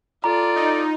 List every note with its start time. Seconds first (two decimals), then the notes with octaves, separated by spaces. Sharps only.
0.24 F4 A4 D5 A#5
0.56 D#4